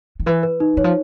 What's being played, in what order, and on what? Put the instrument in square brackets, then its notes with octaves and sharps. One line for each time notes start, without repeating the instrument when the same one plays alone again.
[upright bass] D#3
[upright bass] E3 [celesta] B4
[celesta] B4
D#4
[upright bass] E3 [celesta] C#5
[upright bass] F3